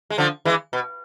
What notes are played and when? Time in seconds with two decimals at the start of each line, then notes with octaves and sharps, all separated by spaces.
0.10 G#3
0.18 D3 F3
0.45 E3 G#3
0.73 B2